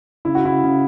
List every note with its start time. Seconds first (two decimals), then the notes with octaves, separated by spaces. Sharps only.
0.25 C#3 E4
0.35 F#4
0.44 C#3 E4
0.63 C#3